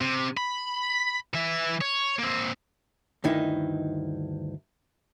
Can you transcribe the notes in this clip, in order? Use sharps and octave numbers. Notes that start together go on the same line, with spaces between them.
C3
B5
E3 E5
C#5
A#3 C4
D2 G2 D#3 D#4 E4